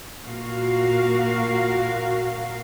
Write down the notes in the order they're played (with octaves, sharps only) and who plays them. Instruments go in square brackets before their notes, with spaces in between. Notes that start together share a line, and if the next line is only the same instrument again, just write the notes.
[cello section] A#2 F#4 A#4 F5